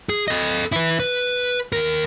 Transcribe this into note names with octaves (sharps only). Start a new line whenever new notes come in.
G#4
A4 D#5
E4 B4
B4
D#2 A#4